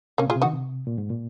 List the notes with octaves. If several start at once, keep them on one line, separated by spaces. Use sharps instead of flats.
C3 A#3 C#4
A#2
F4 G#4
C3
D#4 F#4
D#3
C3
A#2
G#2
A#2